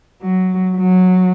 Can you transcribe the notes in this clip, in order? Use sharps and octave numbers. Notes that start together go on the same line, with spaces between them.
F#3
F#3